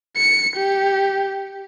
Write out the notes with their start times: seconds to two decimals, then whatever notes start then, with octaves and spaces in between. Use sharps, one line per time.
0.17 C#7
0.56 G4